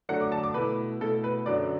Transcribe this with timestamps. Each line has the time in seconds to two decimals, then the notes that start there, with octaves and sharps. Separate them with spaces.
0.09 D3 F#3 A3 D4 F#5
0.21 D6
0.32 A5
0.43 D6
0.54 B2 A3 E4 B4
1.01 B2 A3 E4 A4
1.24 B4
1.46 F#2 D3 F#3 D4 D5